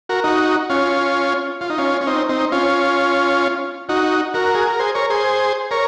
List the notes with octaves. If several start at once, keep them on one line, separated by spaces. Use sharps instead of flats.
F#4 A#4
D#4 F#4
C#4 F4
F4
D#4
C#4 F4
C#4
C4 D#4
C4 D#4
C#4 F4
D#4 F#4
F#4 A#4
G#4
A#4
G#4 C5
A#4 C#5
G#4 C5
A#4 C#5